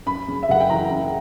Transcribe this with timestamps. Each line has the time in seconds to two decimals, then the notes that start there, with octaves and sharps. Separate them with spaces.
0.06 F#2 B5
0.28 C#3
0.43 E5
0.49 F#1 F#5
0.60 G5
0.70 E3 A#5
0.91 F#2